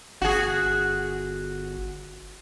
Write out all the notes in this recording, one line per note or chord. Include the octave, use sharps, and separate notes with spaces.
G1 F#4 G#4